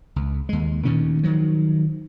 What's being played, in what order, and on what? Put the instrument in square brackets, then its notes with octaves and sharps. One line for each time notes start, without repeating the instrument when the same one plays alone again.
[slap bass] C#2
D#2 G#3
D2 A#2 D#3 C#4
D#3 F3 F#3